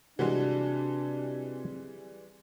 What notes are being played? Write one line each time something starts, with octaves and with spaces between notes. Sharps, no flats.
C3 E3 G3 G#3 D4 F#4